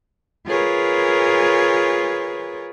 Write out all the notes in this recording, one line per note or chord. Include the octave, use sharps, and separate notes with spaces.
F4 G#4 A#4 B4 C#5